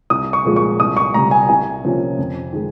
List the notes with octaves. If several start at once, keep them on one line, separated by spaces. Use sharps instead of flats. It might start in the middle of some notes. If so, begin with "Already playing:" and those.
C2 D#6
C#6
A#2 F3 G#3
C#6
C2 D#6
C#6
C3 G3 A#5
G#5
C2 G#5
C3 F3 A#3 C#4
F2
D#3 G#3